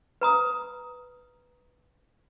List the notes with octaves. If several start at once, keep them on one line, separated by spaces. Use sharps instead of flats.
B4 A#5 D#6